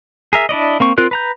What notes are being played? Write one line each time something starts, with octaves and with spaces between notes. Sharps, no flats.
G#4 A#4 E5
D4 E4 D5 D#5
A#3 C4 C#6
C4 F4 A#4 F#6
B4 A#5 G6